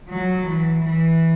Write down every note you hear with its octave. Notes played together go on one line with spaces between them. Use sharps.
F#3
E3
E3